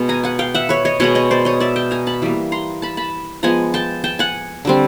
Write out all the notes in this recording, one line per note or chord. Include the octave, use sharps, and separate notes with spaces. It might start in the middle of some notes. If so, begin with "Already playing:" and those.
Already playing: B2 G#3 B3
G#5 A#5
F#5 G#5
F5 G5
E5 F#5
B4 C#5
C#5 D#5
B2 G#3 B3 C#5 D#5
C#5 D#5
C5 D5
C#5 D#5
D5 E5
G5 A5
G#5 A#5
A5 B5
E3 G3 A#3
A#5 C6
A5 B5
A5 B5
F3 G#3 B3 G#5 A#5
G5 A5
G5 A5
F#5 G#5
D3 G3 C4